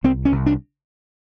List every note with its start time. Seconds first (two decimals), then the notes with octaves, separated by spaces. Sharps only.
0.04 C2 C4
0.25 C#4
0.32 C2
0.46 D4